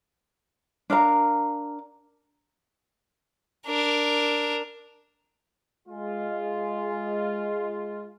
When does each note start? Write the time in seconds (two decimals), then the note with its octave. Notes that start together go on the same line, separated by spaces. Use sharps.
0.90 D4 A#4 F5 A#5
3.67 D4 A#4
5.87 G#3 F4